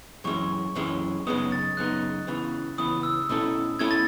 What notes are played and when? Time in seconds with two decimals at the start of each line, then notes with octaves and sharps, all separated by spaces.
0.24 F#2 E3 G#3 C#4 C#6
0.75 F#2 E3 G#3 C#4
1.27 F#2 C#3 G#3 B3 D#4 D#6
1.52 A6
1.77 F#2 C#3 G#3 B3 D#4 F#6
2.27 C#2 C#3 E3 B3
2.78 C#2 C#3 E3 B3 D#6
3.03 E6
3.29 B2 A3 C#4 E4 A4
3.79 B2 A3 C#4 E4 A4 G#6
3.91 A6